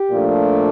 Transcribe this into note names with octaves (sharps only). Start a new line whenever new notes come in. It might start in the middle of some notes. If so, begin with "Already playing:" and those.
Already playing: G4
A#2 F3 A3 D4